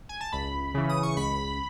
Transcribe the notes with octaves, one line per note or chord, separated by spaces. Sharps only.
G#5
A5
C#2 B5
C#3 E3
D#6
C#6
C#2 B5